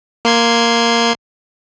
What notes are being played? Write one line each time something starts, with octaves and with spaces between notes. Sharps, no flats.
A#3 C6 G#6